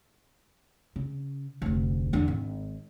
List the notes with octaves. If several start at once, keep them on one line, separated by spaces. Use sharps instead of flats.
C#3
F1 D2
E2 D3
G#1